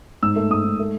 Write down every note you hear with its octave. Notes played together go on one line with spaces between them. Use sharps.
G#2 E6
A3
G#2 D#6
G#2
A3